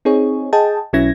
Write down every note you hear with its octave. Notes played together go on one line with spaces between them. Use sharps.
C4 D#4 G#4 C#5
G#4 D#5 G5 A5
B1 F#3 C#4 E4 G#6 A#6